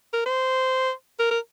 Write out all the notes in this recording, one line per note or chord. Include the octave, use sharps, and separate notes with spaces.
A#4
C5
A#4
A#4